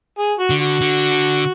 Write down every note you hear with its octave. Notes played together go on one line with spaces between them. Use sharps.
G#4
F#4
D3
F#4
D3